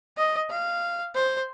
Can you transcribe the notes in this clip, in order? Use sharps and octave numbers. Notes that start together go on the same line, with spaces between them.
D#5
F5
C5